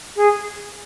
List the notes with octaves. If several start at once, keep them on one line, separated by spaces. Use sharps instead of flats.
G#4